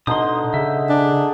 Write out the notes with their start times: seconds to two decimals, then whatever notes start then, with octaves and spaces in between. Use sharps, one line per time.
0.07 B2 D3 D#4 C6 D#6
0.54 C#3 E5
0.89 D4 G#4